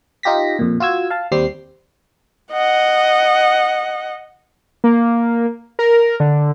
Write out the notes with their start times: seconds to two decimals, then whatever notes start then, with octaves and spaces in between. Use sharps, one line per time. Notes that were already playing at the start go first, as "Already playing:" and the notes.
0.23 D#4 F4 G4 A#6 B6
0.59 F2 A#2
0.80 F4 F#4 E6 G#6
1.10 F5 A5
1.32 D#2 G3 C4 G4 C7
2.52 D#5 F#5
4.84 A#3
5.79 A#4
6.20 D3